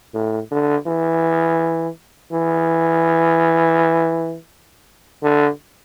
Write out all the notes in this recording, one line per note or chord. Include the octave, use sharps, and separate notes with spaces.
A2
D3
E3
E3
D3